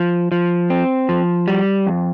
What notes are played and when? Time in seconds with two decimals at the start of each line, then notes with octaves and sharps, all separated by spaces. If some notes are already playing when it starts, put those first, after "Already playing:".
Already playing: F3
0.32 F3
0.70 C4
1.09 F3
1.48 G3
1.87 F2